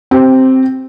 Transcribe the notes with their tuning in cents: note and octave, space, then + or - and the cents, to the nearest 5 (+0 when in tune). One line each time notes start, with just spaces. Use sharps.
C4 +0 G4 -20